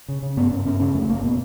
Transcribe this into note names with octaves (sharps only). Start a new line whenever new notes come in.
C#3
C#3
G2 B3
G2 C#4
G2 C#4
C#3 C#4
F2 A3
G1 A#3
A#2 B3